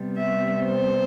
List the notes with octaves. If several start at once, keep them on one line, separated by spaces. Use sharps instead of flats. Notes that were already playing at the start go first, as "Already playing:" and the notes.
Already playing: C3 G3 B3
E5
C5